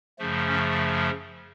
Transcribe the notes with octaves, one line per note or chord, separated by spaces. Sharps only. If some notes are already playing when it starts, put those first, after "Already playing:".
F#2 C#3 F3 A3
C#4